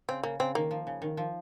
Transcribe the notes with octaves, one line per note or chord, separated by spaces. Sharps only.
C#3 C4
C#3 A#3
C#3 C4
D#3 A#3
F3
C#3
D#3
F3